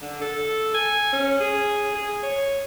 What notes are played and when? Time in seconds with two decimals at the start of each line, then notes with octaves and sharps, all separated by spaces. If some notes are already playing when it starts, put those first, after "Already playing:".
0.02 D3
0.21 A4
0.74 G#5
1.13 C#4
1.40 G#4
1.95 G#4
2.23 C#5